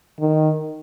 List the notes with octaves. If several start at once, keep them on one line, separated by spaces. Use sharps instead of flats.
D#3